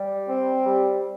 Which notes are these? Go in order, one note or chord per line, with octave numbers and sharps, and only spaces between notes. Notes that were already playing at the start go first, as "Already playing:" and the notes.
Already playing: G3
C4
G3